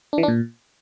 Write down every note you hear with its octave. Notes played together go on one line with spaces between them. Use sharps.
D4
E3
D4
A#2